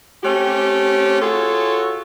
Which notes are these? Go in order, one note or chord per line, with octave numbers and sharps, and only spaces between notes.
A3 C4 C#4 G4
F4 F#4 G#4 A4 C#5